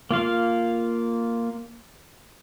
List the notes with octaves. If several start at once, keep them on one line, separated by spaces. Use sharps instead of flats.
A#3 F4 F5